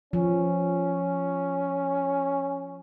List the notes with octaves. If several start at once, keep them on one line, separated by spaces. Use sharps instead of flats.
F3 C#4